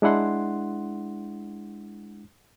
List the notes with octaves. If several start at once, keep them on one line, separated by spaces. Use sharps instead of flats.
G#3 D4 E4 F#5 C6